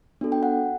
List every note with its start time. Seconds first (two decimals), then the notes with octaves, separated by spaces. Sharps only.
0.21 B3 D4 F#4 A4
0.32 G5
0.43 F#5